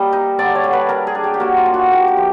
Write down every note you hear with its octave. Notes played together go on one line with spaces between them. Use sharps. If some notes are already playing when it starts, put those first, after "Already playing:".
Already playing: G3 A#3 D#5
D#4
D3 D5
C#5
D3
B4
D4 A#4
G#4
D4
G4
G4
A#3 F#4
F4
D4
F#4
A#3 G4
G4
F3